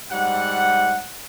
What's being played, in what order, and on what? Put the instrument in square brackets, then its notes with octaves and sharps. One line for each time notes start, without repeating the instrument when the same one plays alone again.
[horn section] G#2 G3 F#5